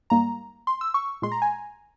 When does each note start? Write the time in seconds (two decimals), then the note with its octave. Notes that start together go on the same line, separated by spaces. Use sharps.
0.10 G#2 G3 A#3 A#5
0.67 C6
0.81 E6
0.94 C#6
1.22 A#2 G#3 C6
1.32 A#5
1.42 G#5